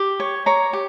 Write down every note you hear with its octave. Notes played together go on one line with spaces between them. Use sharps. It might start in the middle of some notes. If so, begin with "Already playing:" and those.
Already playing: G4
C#5
C#5 A#5
G4